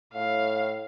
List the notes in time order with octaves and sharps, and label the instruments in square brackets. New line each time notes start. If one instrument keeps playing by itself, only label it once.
[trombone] A2 [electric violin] F5